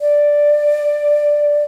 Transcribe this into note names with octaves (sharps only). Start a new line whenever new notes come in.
D5